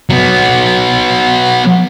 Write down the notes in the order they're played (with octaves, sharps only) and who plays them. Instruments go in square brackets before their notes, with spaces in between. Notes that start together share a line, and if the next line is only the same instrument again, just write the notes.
[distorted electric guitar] F#3 B3